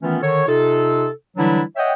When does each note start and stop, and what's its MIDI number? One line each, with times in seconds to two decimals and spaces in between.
0.02 0.18 51
0.02 0.18 52
0.02 0.18 57
0.02 0.18 59
0.02 0.18 61
0.02 0.18 65
0.22 0.46 50
0.22 0.46 51
0.22 0.46 69
0.22 0.46 73
0.47 1.08 48
0.47 1.08 63
0.47 1.08 65
0.47 1.08 69
1.37 1.61 50
1.37 1.61 52
1.37 1.61 54
1.37 1.61 55
1.37 1.61 62
1.37 1.61 64
1.76 1.93 73
1.76 1.93 75
1.76 1.93 76
1.76 1.93 78
1.76 1.93 79